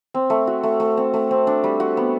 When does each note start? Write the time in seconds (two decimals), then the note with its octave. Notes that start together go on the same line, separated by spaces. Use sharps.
0.14 C4
0.30 A3
0.47 F#4
0.63 A3
0.80 A3
0.97 C4
1.14 A3
1.31 C4
1.47 D4
1.64 G3
1.80 F#4
1.97 B3